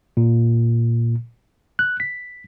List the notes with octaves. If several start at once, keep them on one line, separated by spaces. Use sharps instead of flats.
A#2
F#6
B6